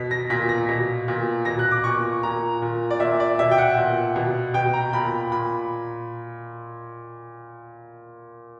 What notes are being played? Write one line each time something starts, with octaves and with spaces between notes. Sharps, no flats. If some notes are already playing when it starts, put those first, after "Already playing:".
Already playing: B2 B6
A#6
A#2 B6
A#6
B2
A#2
B2 A#6
F#6
D6
A#2 C#6
A#2 A#5
A#2
D5
A#2 E5
D5
B2 E5
G5
F#5
A#2
B2
B2 G5
A#5
A#2 B5
A#2 B5